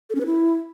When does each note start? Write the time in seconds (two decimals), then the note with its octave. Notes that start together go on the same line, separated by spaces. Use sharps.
0.10 A4
0.15 C#4
0.21 B4
0.26 E4